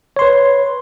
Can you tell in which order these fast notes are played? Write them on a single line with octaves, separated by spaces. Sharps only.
C#5 C6 B4